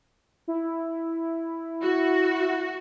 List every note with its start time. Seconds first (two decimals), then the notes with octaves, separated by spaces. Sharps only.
0.48 E4
1.82 F#4